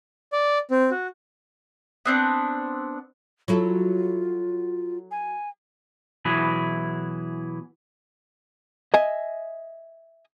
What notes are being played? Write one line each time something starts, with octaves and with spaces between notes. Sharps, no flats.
D5
C4
F#4
B3 C4 D4
F#3 E4 F4 A4
G#5
B2 E3 F#3 E4 G#4
D#5 E5 G#5